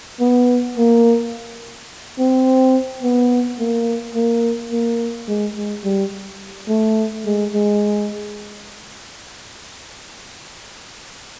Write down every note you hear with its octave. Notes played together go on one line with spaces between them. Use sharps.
B3
A#3
C4
B3
A#3
A#3
A#3
G#3
G#3
G3
A3
G#3
G#3